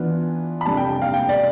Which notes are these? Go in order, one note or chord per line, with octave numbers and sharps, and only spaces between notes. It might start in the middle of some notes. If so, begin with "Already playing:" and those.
Already playing: E3 B3 D4 F4
B5
F2 C3 G3 D4 A5
G5
G5
F5
G5
D5